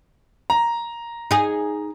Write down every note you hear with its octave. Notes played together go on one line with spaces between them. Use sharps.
A#5
D#4 G#4